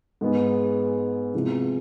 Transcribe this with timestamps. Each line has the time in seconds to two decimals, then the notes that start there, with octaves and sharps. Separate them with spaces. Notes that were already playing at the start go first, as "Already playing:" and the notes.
0.21 G#2 G#3 B3
1.34 C3 F3 G#3 B3 E4